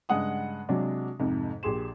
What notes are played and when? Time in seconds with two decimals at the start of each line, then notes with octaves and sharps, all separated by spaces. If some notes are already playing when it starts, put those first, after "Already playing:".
0.09 G2 C#3 G#3 F#5 D#6
0.69 C3 F#3 G#3 D4
1.19 F2 G#2 C3
1.63 A#1 G4 G#4 C6 E7